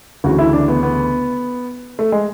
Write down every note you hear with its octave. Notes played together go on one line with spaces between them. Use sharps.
D2 C#3 E3 F#4
E4
D4
B3
B3
A3
G#3